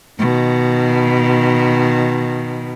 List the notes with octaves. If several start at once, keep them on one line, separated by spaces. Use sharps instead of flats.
B2 D#3